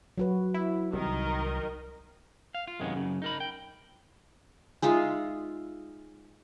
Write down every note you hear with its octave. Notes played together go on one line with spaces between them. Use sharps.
F#3 F#4 B4
E4
C2 D#3 A#4 D#5
F5
F4
F#2 C3 D#3 G#3 B3
F#2 C#3
D#4 A#4 B5
G5
G#3 D#4 F4 E5